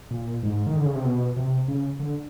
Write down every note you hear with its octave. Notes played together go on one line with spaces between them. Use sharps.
A#2
G#2
D#3
D3
C#3
C3
B2
C3
C#3
D3